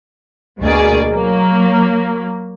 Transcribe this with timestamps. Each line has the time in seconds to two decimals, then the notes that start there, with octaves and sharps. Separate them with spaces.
0.61 D2 B2 A#3 G#4 D5
1.09 F#3 A#3